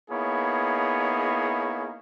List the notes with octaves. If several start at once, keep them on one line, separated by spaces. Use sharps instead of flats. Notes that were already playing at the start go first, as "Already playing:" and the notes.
A#3 B3 D#4 E4 G#4 C#5